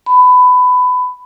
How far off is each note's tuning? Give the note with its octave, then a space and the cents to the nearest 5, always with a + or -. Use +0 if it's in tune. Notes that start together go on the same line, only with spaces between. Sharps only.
B5 +20